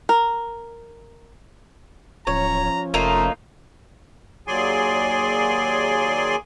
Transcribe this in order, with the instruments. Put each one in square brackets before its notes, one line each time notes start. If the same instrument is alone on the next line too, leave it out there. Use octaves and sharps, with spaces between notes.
[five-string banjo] A#4
[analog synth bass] D1 [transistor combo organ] F3 C#4 [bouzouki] C#5 [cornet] A#5
[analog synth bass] F1 [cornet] A3 [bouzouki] A#3 D#4 F4
[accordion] D#2 F#3 G#4 D5 G#5 C6